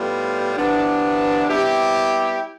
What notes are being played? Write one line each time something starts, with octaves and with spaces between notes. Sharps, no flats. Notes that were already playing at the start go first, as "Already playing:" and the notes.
Already playing: A2 G3 B3 F4
C3 E3 B3 D4
G3 B3 E4 G4